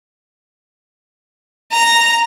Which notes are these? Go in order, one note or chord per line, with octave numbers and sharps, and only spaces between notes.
A#5